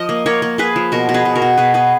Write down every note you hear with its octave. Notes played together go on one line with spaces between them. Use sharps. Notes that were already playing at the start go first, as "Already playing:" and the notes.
Already playing: F3 D#5
A#3
A#3 A#4 C#5
A#3
A#3 G#4 B4
F3
B2 F#4 A#4
B2
G#4 B4
B2
F#4 A#4
B2
B2 G#4 B4
B3 G#4 B4